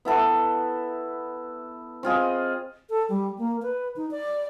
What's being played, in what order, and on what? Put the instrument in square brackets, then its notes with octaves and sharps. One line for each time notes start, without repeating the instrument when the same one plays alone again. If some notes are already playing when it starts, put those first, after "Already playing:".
[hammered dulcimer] B3 E4 A4 F#5
C4 F4 G#4 D#5
[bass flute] A4
G3
A#3
B4
D#4
D5